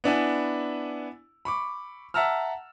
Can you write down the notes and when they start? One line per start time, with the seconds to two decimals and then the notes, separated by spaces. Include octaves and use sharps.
0.04 B3 D4 E4 G#5
1.45 B5 C#6 D6
2.14 E5 F#5 A5 A#5 E6 F6